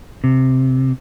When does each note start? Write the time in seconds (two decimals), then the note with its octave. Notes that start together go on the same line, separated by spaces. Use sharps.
0.24 C3